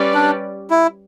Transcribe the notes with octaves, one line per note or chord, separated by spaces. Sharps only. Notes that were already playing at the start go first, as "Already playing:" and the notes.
Already playing: G3 C#4 G4 B4 D5
D4
E4